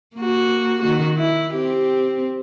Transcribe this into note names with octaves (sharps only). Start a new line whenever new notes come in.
A#3 F#4
D#3 F#4
E4
C4 G4